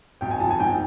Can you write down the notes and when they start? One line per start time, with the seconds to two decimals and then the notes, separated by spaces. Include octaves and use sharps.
0.21 G#1 G5
0.31 G#5
0.40 F3 A5
0.51 G#5
0.60 G#2 G5